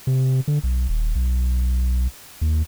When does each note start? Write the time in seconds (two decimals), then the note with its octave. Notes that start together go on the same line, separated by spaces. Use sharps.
0.07 C3
0.48 D3
0.63 B1
0.89 D#1
1.15 B1
2.41 D#2